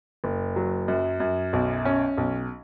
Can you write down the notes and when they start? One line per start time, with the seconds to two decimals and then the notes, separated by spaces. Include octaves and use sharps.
0.24 F#1
0.56 F#3
0.88 F#2
1.20 F#2
1.53 B1
1.85 C#4
2.17 B1